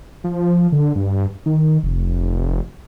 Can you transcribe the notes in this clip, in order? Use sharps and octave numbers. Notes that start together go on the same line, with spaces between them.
F3
D3
G2
D#3
F1